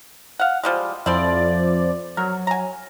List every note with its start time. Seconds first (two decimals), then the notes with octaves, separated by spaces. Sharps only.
0.39 F5 F#5
0.63 F3 G3 G#3
1.06 F2 F3 E4 C5 D5
2.17 F#3 A#4
2.47 G#5 A#5